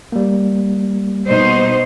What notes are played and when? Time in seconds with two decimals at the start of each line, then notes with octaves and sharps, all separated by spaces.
0.12 G3 A#3
1.27 B2 D#4 C5